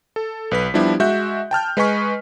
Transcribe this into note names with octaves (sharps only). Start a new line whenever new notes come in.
A4
B1 B4 B6
F3 G3 B3 D4 E4 G4
G#3 F#4 E5 F#6 G6
G5 A5 F6 G6
G#3 B4 D#5 G#5 C#6 B6